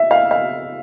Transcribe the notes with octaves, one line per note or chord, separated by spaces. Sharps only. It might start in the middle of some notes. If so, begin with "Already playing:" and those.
Already playing: E5
F5
F5